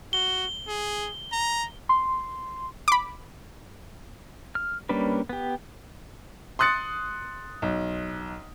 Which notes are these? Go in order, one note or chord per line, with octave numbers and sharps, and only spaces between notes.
F#4 G7
G#4
A#5
C6
B5 D6
F6
G3 A#3 C#4 D4 B4
B3 G4
C6 D#6 F#6 A6 C#7
B1